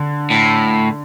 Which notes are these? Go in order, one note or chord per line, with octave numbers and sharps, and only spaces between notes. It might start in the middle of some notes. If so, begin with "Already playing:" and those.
Already playing: D3
A2